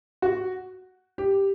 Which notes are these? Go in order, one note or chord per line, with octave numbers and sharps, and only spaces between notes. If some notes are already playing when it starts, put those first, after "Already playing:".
F#4
G4